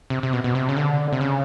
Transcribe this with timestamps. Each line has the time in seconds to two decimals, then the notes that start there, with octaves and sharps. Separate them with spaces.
0.10 C3
0.23 C3
0.33 B2
0.44 B2
0.55 C3
0.69 C#3
0.77 D3
1.12 C3
1.21 C#3